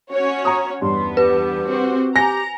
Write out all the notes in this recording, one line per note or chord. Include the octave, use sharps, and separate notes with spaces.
C#4 F#4 C#5
A#5 D#6
E2 G2 B3 C6
G4 B4
C4 F#4 C5
G4 G#5 A#5 A#6